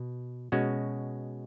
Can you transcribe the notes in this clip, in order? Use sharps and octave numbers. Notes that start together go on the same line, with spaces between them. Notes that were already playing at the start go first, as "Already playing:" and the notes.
Already playing: B2
B2 G#3 C#4 F#4